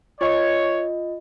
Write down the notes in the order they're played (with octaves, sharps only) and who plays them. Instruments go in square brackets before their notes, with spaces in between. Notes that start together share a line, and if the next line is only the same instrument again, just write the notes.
[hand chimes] F4 D#5 [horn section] C#5